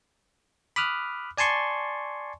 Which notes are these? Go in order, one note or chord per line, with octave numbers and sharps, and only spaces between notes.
B5 D6 D#6 F6 F#6
D5 G#5 A5 C6 C#6